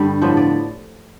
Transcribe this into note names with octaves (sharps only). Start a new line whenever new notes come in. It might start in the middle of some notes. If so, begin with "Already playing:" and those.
Already playing: G2 D3 G3
A2 F3 B3 D4 C5
D5